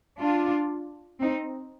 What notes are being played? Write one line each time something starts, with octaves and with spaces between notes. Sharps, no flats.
D4 F4
C4 D#4